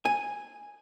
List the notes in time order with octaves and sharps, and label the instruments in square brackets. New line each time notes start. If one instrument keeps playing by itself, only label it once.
[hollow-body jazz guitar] G#5